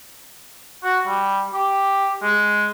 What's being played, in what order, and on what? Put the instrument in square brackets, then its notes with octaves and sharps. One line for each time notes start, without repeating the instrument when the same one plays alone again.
[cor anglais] F#4
G3
G4
G#3